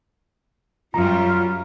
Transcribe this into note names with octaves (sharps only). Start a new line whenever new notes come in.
F#2 G3 F4 A#5